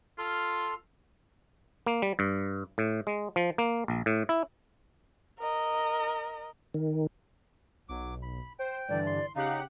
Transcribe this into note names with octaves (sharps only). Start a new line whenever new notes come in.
F4 A4 C6 F6
A#3
G3
G2
A2
G#3
F3
A#3
A#1
A2
E4
A#4 D#5
D#3
B1 F#3 D6
B5
C5 G5
G2 D3 E3 D5
C6
C#3 D#4 G4 F5 F#5